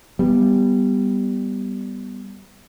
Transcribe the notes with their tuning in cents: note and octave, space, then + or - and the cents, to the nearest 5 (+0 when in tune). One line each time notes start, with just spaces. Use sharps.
G3 +0 B3 +0